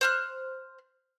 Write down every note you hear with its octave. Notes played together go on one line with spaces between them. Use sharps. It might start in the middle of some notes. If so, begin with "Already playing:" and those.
C5 F6 F#6